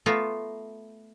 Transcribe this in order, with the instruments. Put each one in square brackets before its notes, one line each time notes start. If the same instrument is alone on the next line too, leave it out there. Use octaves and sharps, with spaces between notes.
[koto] A3 B3 F4 A#5